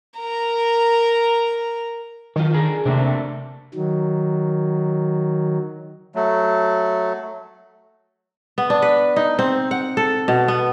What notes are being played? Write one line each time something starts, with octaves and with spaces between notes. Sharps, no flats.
A#4 A#5
D#3 F#3 F4
D3 G#4 A#4
C3 A3 A#3 D4
D#3 F#3
F#3 A3
B3
D4
B4
D#4
C4
F#5
A4
B2
B3